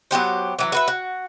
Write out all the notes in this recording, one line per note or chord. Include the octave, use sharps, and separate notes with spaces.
F#3 B3 G4 C5
E3 F#3
F#4 B4 E5
F#4